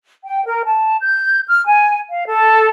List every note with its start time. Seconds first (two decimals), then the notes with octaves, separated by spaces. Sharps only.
0.23 G5
0.46 A#4
0.65 A5
1.01 G6
1.49 F6
1.66 G#5
2.10 F5
2.26 A4